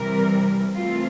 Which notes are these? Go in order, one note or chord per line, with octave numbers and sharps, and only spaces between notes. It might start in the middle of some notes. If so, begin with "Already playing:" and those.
Already playing: C3 E3 G3 A#4
E3 A3 C4 F4